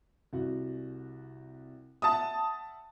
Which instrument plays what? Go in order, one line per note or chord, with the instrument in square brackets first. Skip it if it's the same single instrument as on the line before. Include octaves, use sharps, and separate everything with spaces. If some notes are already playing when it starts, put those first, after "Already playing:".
[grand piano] C2 F#4
[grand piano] E5 F#5 [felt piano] A5 D#6